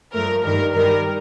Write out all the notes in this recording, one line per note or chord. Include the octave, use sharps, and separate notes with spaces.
G2 F3 A3 A#4
G2 D#3 G3 A#4
G2 D#3 G3 A#4